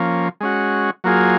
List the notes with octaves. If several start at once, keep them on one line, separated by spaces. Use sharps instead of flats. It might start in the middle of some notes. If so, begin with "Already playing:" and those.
Already playing: F3 A#3 C#4
G#3 C#4 F#4
F#3 A#3 F4 G#4